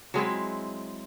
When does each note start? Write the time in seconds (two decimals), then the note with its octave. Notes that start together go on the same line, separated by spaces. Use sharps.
0.14 F#3 G#3 C4 E4